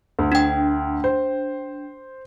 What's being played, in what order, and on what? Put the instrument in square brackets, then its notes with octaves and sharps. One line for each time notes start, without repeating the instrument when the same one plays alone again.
[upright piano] D2
[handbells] D4 G5
[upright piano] C5